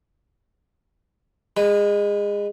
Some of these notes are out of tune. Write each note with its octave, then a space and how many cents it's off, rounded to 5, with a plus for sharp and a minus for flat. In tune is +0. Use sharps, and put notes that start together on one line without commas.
G#3 -25 B4 +5